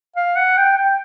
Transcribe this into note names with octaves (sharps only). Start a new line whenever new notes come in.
F5
F#5
G5
G5